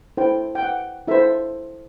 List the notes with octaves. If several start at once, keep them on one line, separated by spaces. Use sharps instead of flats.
E4 A4 C5 G5
G5
F#5
E4 A4 C5 E5